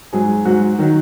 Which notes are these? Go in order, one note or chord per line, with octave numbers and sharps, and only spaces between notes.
G#2 F#3 G#4
G#2 F#3 F#4
D#3 F#3